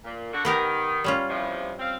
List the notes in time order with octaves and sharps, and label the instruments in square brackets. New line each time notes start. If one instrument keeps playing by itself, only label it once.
[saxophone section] A#2
D3 F#4
[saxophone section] D#3 [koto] B3 G4 A#4
[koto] G3 C#4 F4
[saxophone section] E2 C3 F3
C4 F5